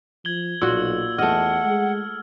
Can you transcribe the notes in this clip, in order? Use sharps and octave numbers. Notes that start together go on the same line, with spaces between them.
F3 G#6 F#7 G7
B1 A#2 F#4 E6
E2 A3 D#5 F#5 F6
G#3